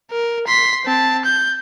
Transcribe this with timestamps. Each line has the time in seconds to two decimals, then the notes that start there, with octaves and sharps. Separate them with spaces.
0.11 A#4
0.47 C6 B6
0.85 C4 A5
1.25 G6